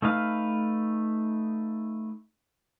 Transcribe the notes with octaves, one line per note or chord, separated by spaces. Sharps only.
A3 D#4 B4 F5